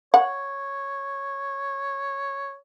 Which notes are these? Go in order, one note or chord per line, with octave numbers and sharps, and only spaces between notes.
C#5 F#5